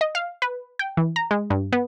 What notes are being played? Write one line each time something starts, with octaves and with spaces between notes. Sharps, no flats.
D#5
F5
B4
G5
E3
A#5
G#3
G2
B3